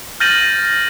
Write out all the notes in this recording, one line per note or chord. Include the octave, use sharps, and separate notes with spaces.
F6 G6 A6 A#6 D#7 F#7